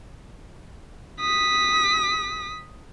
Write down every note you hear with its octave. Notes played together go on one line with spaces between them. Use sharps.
D#6 B6